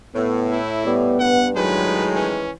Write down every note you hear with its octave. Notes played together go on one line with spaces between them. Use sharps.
A2 B3
A3 E4
G3 B3
G2 F#5
A2 D#3 F#3 G#3 B4
E3 C#4